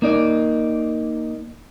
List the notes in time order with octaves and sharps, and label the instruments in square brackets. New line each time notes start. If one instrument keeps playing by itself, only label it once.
[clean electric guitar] A#3 D#4 D5